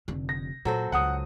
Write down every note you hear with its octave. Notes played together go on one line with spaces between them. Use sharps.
F1 D3
A#6
A#2 F#3 A4 C5
C#2 C#3 F#5 D#6